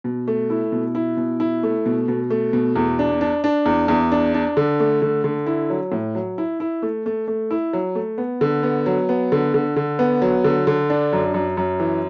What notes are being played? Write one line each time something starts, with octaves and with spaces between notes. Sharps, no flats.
B2
A3
E4
B2
E4
B2
E4
A3
B2
B2
A3
B2
E2
D4
D4
D4
E2
E2
D4
D4
D3
A3
D3
D3
E4
F#3
A2
F#3
E4
E4
A3
A3
A3
E4
F#3
A3
B3
D3
B3
F#3
B3
D3
D3
D3
B3
F#3
D3
D3
D4
F#2
F#2
F#2
E3